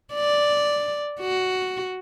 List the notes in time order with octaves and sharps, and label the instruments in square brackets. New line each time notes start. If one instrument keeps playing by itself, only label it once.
[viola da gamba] D5
F#4